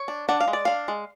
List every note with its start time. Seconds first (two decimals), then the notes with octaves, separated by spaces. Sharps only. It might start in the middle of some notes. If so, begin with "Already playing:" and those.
Already playing: C#5
0.08 D4
0.29 D4 F#5
0.40 F5
0.48 G#3
0.53 D5
0.65 D4 F5
0.88 G#3